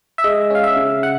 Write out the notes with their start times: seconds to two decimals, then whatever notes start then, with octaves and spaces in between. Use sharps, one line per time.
0.18 E5
0.24 G#3 D#5
0.50 C#4 F5
0.64 E5
0.76 C#3
1.03 F#5